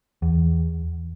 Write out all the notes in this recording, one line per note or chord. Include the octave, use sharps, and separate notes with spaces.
E2